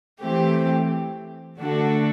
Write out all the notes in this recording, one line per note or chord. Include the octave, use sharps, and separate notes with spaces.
E3 A3 C4 G4
D3 A3 D4 F#4 A4